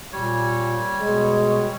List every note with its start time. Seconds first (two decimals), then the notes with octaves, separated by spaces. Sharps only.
0.13 A#2 G3 C#5
1.00 B2 G#3